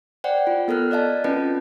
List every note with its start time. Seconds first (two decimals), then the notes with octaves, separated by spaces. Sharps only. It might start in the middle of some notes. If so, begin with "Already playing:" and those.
0.24 C5 D5 F#5 G5
0.47 F4
0.68 B3 A4 A#4 F6 F#6
0.91 D5 D#5 F5 A5
1.24 C4 C#4 F4 B4 A5